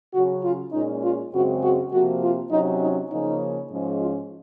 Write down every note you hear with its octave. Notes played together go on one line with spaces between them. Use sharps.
C#3 F#3 C#4 F#4
F4
A#2 G#3 C#4 D#4
F4
F#2 C#3 G#3 C4 F#4
F#4
C3 F3 A#3 F#4
F4
C3 F#3 C#4 D#4
D#4
C#3 F3 A#3 C#4 D#4
G#2 F3 G#3 C#4
F4